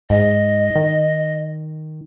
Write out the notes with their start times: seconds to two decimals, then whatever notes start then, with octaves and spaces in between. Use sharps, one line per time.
0.10 G#2 D#5
0.76 D#3